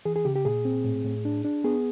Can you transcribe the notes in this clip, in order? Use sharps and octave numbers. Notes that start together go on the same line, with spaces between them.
E3 G#4
G#4
C#3 G4
G4
A#2 G#4
C4
A2
A2
D4
D4
B3 G#4